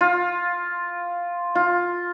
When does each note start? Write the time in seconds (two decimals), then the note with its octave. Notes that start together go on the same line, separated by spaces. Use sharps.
0.01 F4
1.55 F4